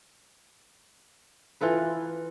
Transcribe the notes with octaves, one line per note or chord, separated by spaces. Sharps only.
E3 F4 A4 B4